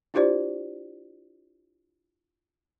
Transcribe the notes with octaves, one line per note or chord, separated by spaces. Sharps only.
D4 E4 F4 G4 C5 D5